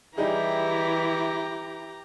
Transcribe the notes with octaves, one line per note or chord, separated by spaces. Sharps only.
E3 G3 D#4 E4 G4 G#4 A#5